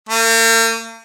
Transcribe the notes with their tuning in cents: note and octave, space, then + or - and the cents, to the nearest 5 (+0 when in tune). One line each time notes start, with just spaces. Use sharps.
A#3 -45